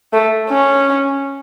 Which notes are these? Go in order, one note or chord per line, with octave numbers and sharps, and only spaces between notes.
A3
C#4